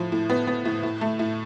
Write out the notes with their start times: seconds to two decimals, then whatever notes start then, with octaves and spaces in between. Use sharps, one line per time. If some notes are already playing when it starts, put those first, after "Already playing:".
Already playing: A2 F3
0.12 A2
0.30 B3
0.47 B3
0.65 A2
0.83 A2
1.01 A3
1.19 A2